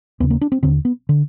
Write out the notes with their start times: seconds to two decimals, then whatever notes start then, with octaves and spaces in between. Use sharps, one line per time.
0.20 D#2 B3
0.23 C#3
0.30 A#3
0.41 D4
0.52 C4
0.63 D#2 D3 C4
0.85 B3
1.09 D3